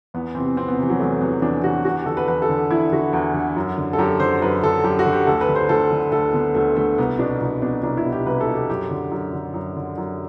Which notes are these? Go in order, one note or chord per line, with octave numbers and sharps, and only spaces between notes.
E2 B3
E3 C4
C3
E2 C4
B3
C3 E3
F#3
E2 A3
C3 E3 B3
E2 D4
C3 E3 F#4
E2 F#4
G4
D3 A4
B4
E2 B4
A4
D3
E2 E4
D3 F#4
E2
D3
F#2
D3
A4
F#2 G4
D3 C5
F#2 B4
D3 A4
F#2 G4
F#4
D3
G4
D2 A4
B4
D3
C5
D2 A4
D3
D2 A4
D3 B3
D2 A3
D3 A3
C2 B3
B2 D4
C2
B2 D4
C2 D4
E4
B2
G4
C2 B4
A4
B2
G4
F#2 G4
D3
F#2
D3
F#2
D3
F#2